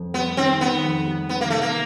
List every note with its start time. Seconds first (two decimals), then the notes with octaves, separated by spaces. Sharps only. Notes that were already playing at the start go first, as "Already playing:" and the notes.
Already playing: F2
0.14 G3 B3
0.37 D#3 C4
0.61 D#3 B3
0.84 F2
1.07 G3
1.29 D#3 B3
1.41 A#3
1.50 C3 A3
1.62 A#3